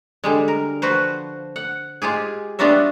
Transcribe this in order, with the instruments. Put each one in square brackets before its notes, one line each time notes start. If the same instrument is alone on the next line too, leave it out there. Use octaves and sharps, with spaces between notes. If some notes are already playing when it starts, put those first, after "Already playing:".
[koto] D3 G3 G#3
A#4
F3 F#4 B4 C5
F#5
G#3 F4 G4 G#4
G3 B3 D4 F4 F#4 E5